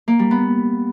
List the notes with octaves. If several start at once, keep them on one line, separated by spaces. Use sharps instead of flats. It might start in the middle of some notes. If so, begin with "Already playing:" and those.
A#3
G3
B3